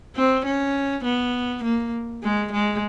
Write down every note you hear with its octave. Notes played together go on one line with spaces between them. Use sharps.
C4
C#4
B3
A#3
G#3
G#3